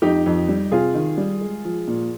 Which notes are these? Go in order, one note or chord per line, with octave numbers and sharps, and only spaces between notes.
F2 D#4 G4
F2
G3
C3 F4 G#4
D#3
G3
G#3
F3
A#2